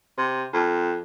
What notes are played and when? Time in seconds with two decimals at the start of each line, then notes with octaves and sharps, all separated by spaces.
0.18 C3
0.53 F2